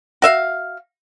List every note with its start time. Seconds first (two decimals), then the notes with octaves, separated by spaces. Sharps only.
0.22 F#4 E5 F5